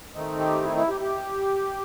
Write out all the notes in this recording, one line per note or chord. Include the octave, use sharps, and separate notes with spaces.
D#3 A3 C4 D#4
G4
E4
E4
G4
G4